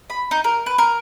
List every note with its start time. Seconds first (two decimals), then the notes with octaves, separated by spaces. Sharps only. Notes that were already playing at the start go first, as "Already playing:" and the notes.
0.10 B5
0.31 D#4
0.44 A#4
0.66 B4
0.78 A#4